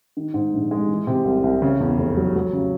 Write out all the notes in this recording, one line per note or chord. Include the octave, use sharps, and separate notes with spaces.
D#3
G#2
A#1
G#3
E3
C3
C2
C2
C#3
E2
F1
F#3
F#3
C#3